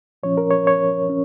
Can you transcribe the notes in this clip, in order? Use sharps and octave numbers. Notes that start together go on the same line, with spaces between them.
A#2 F3 C#4 C#5
A#4
C#5
C#5
C#4